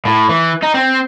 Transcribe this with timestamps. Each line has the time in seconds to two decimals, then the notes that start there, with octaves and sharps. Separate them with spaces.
0.05 A2
0.29 E3
0.62 D#4
0.74 C4